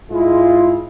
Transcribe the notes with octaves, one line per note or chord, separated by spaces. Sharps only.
G#2 G#3 E4 F4